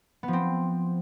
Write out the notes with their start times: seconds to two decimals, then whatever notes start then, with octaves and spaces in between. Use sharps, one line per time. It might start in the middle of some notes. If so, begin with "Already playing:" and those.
0.23 B3
0.28 F3
0.33 C4